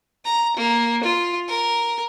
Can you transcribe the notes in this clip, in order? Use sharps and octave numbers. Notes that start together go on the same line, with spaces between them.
A#5
A#3
F4
A#4